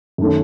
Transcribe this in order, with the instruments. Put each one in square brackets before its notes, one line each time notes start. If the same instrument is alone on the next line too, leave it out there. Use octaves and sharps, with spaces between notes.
[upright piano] F#2 D#3 A3 C#4